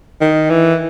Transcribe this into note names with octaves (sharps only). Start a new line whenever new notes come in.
D#3
E3